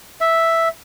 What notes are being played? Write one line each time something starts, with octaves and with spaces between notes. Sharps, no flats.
E5